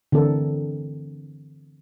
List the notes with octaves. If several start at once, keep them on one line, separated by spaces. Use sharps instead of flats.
D3 E3 C4 A4 A#4